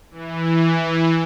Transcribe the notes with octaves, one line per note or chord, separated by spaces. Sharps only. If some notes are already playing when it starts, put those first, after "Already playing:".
E3